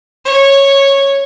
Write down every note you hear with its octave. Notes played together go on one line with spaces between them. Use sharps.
C#5